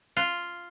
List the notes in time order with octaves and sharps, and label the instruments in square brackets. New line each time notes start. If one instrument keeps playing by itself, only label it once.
[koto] F4